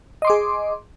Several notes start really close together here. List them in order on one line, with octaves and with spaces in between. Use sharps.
D#5 C6 D6 G#4